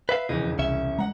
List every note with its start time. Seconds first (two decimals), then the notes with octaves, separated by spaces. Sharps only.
0.09 B4 E5 F5
0.29 E1 F2 C#3 E3 D#4
0.59 C2 C#4 E5
0.99 G#3 F#5 A#5